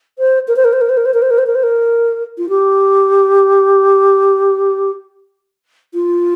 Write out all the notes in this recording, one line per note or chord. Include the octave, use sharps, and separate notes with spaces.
C5
A#4
C5
A#4
C5
A#4
C5
A#4
C5
A#4
C5
A#4
C5
A#4
C5
A#4
F4
G4
F4